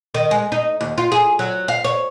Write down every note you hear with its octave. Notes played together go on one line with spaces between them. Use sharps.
D#3
G#3
D#4
D#2
F4
G#4
F#3
F5
C#5